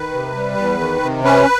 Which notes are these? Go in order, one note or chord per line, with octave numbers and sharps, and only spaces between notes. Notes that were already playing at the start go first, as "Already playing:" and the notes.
Already playing: D#3 B4
C3
G3
E2
D#3
C3
C#4 B4